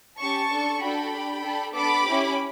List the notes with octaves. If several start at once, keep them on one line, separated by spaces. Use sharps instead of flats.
C#4 G4 A5 C#6
D4 A4
D4 F#4 A4 G5 B5
D4 G4
D4 A4
B3 D4 A4 B5 D6
C#4 E4 G4